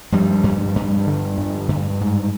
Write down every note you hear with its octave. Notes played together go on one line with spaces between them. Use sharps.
G2 F3 G3
G2
G2
D3
G2
G2
G#2